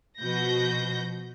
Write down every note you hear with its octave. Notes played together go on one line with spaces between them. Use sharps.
B2 F3 F#4 B4 G6 A#6